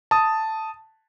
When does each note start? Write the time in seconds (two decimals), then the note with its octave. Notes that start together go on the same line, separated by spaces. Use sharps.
0.11 A5 D#6